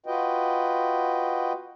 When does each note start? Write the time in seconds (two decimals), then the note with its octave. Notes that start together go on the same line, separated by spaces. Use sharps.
0.06 F4 F#4 B4 D#5 G5